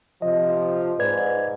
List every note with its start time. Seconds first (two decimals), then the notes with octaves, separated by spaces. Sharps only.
0.22 C3 F3 D#5
0.99 G#2 B4 D5 G#6